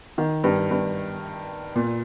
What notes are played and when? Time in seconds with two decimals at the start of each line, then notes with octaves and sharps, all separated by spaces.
0.18 D#3
0.44 G2
0.71 G2
1.75 A#2